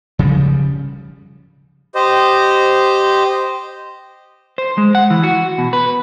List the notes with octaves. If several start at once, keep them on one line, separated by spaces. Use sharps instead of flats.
C#3 F3 G3
G4 C5 D#5
C5
G#3
F#5
E3
F#4
B2
B4